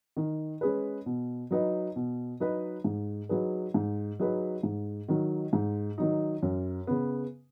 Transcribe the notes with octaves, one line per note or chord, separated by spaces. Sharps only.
D#3
G#3 C#4 G#4 B4
B2
F#3 D#4 B4 D#5
B2
F#3 D#4 B4 D#5
G#2
F#3 D#4 G#4 B4
G#2
F#3 D#4 G#4 B4
G#2
D#3 F#3 D#4
G#2
D#3 F#3 D#4
F#2
C#3 B3